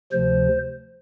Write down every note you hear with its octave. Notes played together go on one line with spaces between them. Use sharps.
D2 C3 F3 C5